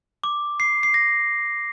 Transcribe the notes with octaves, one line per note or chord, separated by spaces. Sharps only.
D6
C7
C7
A#6